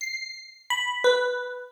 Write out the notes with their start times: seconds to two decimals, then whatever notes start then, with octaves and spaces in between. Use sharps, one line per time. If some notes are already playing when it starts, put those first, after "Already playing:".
0.01 C7
0.70 B5
1.04 B4